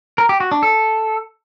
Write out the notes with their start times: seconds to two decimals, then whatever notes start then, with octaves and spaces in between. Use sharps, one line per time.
0.18 A#4
0.29 G4
0.40 F#4
0.52 D4
0.63 A4